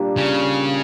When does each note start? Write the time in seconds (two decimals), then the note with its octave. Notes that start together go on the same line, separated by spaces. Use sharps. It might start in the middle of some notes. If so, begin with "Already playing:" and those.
Already playing: A#2 G3 A#3 D4
0.17 C#3